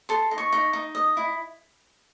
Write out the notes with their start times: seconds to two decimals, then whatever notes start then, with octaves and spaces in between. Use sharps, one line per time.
0.09 A4 C6
0.31 D#4
0.38 C#6
0.52 D#4
0.73 D#4
0.95 D#5
1.17 E4